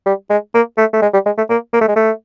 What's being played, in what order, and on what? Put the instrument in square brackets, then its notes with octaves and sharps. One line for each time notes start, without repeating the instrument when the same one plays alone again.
[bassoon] G3
G#3
A#3
A3
A3
G#3
G3
G#3
A3
A#3
A#3
A3
G#3
A3